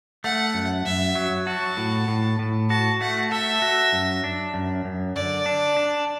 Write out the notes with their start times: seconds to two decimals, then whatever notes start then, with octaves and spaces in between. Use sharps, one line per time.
0.24 A3 F#5
0.54 F#2
0.85 F#2 E5
1.15 F#3
1.47 F#4 A5
1.77 A2
2.08 A2
2.39 A2
2.70 F#4 A5
3.01 A3 F#5
3.31 A4 E5
3.62 F#4
3.93 F#2
4.24 D4
4.54 F#2
4.85 F#2
5.16 D3 D5
5.46 D4
5.77 D4